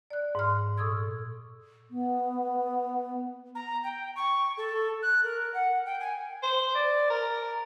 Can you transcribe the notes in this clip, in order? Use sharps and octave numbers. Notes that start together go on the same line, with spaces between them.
D5 F#6
G#2 F6
A#2 A4 C#6 D#6 E6 G#6
B3
A#5
G5
C#6
A4
F#6
A#4
F#5
G5
G#5
C5
D5
A#4